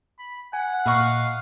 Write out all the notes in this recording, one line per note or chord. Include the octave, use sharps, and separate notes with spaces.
B5
F#5 G#5
A#2 B4 D#5 F5 C#6